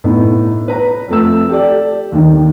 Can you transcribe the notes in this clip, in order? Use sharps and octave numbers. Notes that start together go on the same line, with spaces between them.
A2 B3 D#4
B4 A#5
F2 A3 E6
G4 A4 D5
D#2 D#3